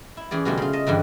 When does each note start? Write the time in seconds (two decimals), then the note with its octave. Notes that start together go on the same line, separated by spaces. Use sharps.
0.17 E4
0.31 E3 C#4 G#4 D5
0.45 B2 D3 F#3 G3 A3 F4
0.58 C#3 F4
0.73 D#5 A5
0.87 G2 D3 E3 G3